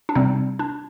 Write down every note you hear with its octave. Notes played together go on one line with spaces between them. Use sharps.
D4
C3 G3 C4 D#4
D4